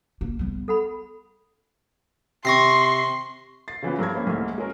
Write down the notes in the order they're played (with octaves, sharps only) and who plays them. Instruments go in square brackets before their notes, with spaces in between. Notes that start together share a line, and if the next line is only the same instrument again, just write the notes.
[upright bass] A#3
G3 B3
[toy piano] A4 F#5 B5
[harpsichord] C3 [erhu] C6 [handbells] C#6 A#6 C7
[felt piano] A6 C7
C#3 E3 F3 B3
G2 A#4 C#6 G#6
A#3 C4 C#4 E4
C2 G#2 A3 A#3
G#3 C#4 A#4